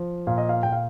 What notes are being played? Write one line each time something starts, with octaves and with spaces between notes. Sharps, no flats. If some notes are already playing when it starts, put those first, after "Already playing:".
Already playing: F3
A#2 F5
D#5
F5
A#2 G5
F5